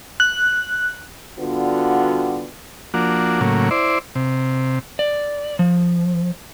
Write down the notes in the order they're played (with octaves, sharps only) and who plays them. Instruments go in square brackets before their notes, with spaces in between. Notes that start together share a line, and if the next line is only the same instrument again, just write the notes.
[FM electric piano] F#6
[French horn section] D3 G3 B3 F4 F#4
[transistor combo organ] F3 A#3 D4 F#4
A2 C#3 F#3 A#3
E4 C5 D5
C3
[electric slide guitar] D5
F3